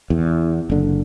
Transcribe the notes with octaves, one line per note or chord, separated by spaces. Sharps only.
E2
F#1 D3